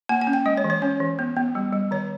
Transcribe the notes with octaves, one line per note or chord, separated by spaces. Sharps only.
A#3 G#5
G#5
C#4
G5
G#3 D#5
C#5
E3
C#5
C#4 C#5
E3
B3
B3
G3
G3
D#3 C#5